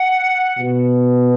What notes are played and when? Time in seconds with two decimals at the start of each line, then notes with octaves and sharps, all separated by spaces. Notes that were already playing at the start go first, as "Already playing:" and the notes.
Already playing: F#5
0.58 B2